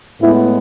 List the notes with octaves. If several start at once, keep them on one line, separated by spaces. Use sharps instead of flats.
A2 G#3 B3 E4